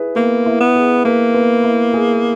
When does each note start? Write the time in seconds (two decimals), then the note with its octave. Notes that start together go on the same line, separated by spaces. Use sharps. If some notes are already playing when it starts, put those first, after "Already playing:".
Already playing: E4 G#4 B4
0.16 A#3 B3
0.46 E4
0.60 B3
0.76 G#4
1.05 A#3 B4
1.34 B3
1.64 E4
1.94 G#4